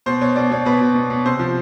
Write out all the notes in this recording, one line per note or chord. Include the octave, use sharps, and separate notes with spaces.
B2 C5
B2 C#5
B2 D5
B2 C#5
B2 B4
B2
B2
B2
C3 C5
F3